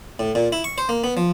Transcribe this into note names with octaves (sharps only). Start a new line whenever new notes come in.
A2
A#2
E4
C#6
C5
A#3
B3
F3